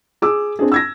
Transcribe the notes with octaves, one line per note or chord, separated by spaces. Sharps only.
G#4 D6 E6
C4 D4 G#4
E6 G#6 A#6